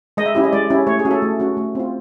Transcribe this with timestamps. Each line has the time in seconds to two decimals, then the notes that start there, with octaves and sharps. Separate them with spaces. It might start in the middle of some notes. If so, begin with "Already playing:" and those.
0.17 G#3 D#5
0.26 E5
0.35 C#4 E4 G4
0.44 D#5
0.53 G#3 D5
0.70 C#4 E4 G4
0.87 A3 C#5
0.99 G#4
1.05 C#4 F#4
1.11 A4
1.22 A3
1.40 C#4 F#4
1.57 A3
1.75 C4 F4